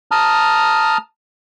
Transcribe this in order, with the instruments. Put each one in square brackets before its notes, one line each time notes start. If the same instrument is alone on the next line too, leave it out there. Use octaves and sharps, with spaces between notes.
[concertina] A5 A#5 D#6 F6